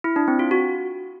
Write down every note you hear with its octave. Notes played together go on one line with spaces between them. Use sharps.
E4
D4
C4
F4
F#4